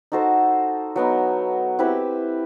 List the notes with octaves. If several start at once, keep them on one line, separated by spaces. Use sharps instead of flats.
D#4 F#4 A4 C5
F#3 B3 D#4
C4 E4 G4 B4